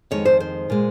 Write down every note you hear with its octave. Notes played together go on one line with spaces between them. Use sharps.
F2 D#3 G#3 C#5
C5
C5
A#2 G#3